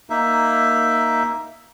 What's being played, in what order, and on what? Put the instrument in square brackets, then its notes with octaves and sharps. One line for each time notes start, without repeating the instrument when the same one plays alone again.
[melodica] A#3 D#4 E5